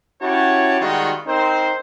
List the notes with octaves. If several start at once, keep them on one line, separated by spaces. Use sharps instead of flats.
C#4 E4 F#4 G4 C#5 A5
D#3 G3 G#3 F4 F#4
C4 D#4 A#4 C5